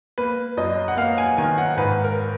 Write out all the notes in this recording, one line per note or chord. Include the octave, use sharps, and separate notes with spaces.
A#3 B4
F#2 D#5
F#5
A#3 F5
G#5
D#3 G#5
F#5
G#2 B4
A#4